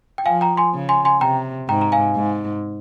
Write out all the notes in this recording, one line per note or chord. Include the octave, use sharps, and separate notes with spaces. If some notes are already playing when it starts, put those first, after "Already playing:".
G5
F3 F5 G#5
G5 A#5
G#5 C6
C#3
G#5 C6
G#5 C6
C3 G5 A#5
G#2 G5 A#5
A#5
F5 G#5
G#2